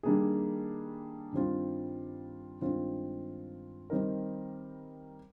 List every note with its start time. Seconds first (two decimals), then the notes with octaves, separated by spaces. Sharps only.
0.03 D#3 G3 A#3 D4 G#4
1.32 G2 D#3 G3 C4 F4
2.61 G2 D#3 G#3 C4 F4
3.90 D#3 G3 C4 D#4 A#4